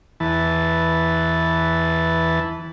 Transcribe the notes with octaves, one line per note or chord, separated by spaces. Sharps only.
E2 E3 B4 A5